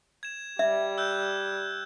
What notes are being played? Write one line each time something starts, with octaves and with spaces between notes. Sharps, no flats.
G#6 E7
G3 E5 G#6
E6 F#6 G6